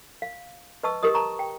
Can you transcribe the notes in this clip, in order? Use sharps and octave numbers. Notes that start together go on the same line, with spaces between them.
F5
B4 D#5 A5 C#6 E6
G4 A#4 D#5 D#6
A5 A#5 C#6
G5